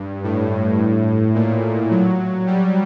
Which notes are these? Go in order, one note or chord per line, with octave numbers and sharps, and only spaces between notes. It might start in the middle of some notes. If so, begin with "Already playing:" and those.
Already playing: G2
A2
A#2
F#3
G3